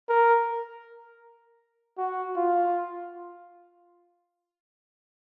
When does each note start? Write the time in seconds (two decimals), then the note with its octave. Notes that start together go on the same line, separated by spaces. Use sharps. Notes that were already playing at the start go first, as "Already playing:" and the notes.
0.09 A#4
1.98 F#4
2.36 F4